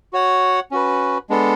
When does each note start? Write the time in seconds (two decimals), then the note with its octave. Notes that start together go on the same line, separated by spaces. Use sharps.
0.13 F#4 C#5 F#5
0.71 C#4 F#4 B4
1.30 G#3 B3 D4 A4